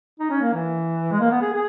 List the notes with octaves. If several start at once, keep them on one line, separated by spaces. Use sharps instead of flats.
D#4
C#4
A#3
E3
G#3
A#3
B3
G#4
G#4